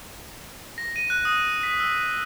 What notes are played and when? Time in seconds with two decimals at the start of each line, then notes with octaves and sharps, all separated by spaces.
0.78 A#6
0.96 D#7
1.10 F#6
1.25 D#6
1.63 B6
1.80 E6